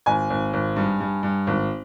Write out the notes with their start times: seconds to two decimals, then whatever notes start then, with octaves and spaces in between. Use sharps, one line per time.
0.06 G#1 G#5
0.30 G#1
0.53 G#1
0.76 G2
1.01 G2
1.23 G2
1.47 G#1